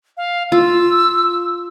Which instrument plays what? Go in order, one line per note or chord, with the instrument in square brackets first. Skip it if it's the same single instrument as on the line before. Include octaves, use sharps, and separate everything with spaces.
[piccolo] F5
[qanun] F4 [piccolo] E6